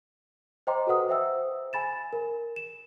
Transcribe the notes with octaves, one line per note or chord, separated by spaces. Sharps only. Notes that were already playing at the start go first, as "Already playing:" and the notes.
C5 D#5 G5 A#5 C6 D6
F#4 A4 B4 F#5 D#6
C5 E5 G5 E6
G#5 B5 A6 E7
A#4
E7